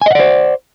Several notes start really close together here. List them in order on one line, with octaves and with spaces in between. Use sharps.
G#5 D#5 F#5 D5 C5